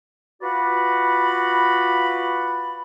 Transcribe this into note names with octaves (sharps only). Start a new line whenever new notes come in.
F4 F#4 B4 D5 F#5 B5